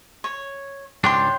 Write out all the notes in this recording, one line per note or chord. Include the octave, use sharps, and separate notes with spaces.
C#5
C#2 G#2 D4 C#5 G5 C6